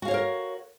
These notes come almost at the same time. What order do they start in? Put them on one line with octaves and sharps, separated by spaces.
F#4 F5 C#5 C5 A#4